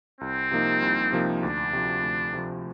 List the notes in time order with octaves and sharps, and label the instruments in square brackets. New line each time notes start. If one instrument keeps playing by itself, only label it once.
[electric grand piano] C2 [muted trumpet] C4
[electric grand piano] C3 F3 A#3 D#4
C2
C3 F3 A#3 D#4
[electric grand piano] D2 [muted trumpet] D4
[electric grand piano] C3 F3
D2
C3 F3